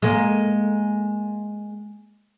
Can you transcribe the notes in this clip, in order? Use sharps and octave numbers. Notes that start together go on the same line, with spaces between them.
G#3 A#3